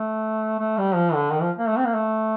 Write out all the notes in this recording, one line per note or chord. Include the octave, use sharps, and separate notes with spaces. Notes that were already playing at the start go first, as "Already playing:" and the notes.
Already playing: A3
A3
G3
F3
D3
D#3
F3
A#3
A3
C4
A#3
A3